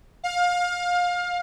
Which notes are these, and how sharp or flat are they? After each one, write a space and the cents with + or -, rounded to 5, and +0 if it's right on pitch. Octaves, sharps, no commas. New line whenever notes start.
F5 +25